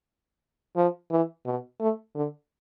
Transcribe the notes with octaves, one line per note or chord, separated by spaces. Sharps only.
F3
E3
B2
A3
D3